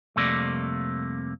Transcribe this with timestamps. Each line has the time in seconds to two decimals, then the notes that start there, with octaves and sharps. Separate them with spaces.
0.16 C2 F2 C3 A3 A#3 D5